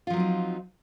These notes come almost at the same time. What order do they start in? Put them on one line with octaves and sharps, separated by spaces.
F4 F3 F#3 C4 D#4